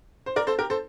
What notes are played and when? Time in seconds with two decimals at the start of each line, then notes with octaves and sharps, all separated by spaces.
0.26 C5
0.36 A#4 D5
0.47 A4 C5
0.59 G4 A#4
0.70 A4 C5